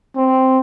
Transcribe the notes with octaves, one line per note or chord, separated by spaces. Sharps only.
C4